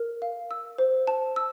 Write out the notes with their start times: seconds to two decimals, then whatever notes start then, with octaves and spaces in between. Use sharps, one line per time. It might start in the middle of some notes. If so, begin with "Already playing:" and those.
Already playing: A#4
0.22 F5
0.51 E6
0.78 C5
1.07 A5
1.36 E6